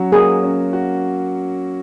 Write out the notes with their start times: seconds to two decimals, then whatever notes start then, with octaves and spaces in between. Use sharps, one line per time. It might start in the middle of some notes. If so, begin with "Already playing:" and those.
Already playing: F#3 C#4 F#4
0.12 A#3 G#4
0.43 C#4
0.73 F#4